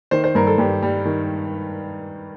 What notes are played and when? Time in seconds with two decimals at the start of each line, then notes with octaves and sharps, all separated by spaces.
0.11 D#3 C5
0.24 C5
0.35 G2 A#4
0.47 A4
0.58 G2 G4
0.83 G3
1.05 D#3